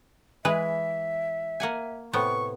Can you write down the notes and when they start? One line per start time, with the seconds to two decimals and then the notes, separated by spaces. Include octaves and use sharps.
0.45 E3 G#3 B4 E5
1.60 A#3 F#5 G#5
2.13 A2 C3 B3 C#6